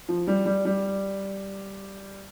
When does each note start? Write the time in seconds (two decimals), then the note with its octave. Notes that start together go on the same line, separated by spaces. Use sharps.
0.09 F3
0.27 G3
0.46 G3
0.65 G3